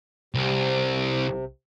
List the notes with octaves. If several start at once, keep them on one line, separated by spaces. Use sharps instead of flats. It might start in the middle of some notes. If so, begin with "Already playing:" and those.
C2 C3